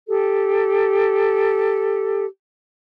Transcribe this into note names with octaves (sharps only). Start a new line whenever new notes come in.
G4 A4